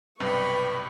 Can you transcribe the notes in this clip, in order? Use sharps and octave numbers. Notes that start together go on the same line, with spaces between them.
B1 G2 C3 B4 D5 G5 B5 C#6